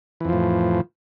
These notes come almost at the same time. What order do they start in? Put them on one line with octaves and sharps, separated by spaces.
E3 F2 F3 A2